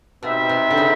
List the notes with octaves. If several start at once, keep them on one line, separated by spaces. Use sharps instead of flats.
B2 C4 D#4 G4 B4 E5
C3
D3
C#3